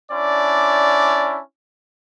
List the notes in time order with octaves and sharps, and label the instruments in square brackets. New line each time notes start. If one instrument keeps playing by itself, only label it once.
[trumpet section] C#4 D4 E4 D5